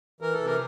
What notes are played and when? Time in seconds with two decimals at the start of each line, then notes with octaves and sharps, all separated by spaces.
0.21 E3 A#4
0.34 A4
0.41 C3
0.46 A#4